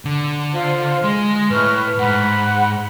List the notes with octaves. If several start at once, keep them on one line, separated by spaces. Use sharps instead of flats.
D3
F4 C5
G#3 D#5
A2 B4 C#6 F6
G#2 F#5 B5